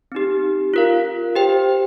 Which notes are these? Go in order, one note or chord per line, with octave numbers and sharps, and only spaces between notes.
C4 D#4 G4
F4 A#4 F5
G4 C5 G5